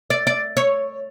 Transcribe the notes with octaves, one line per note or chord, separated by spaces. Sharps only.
D5
D5
C#5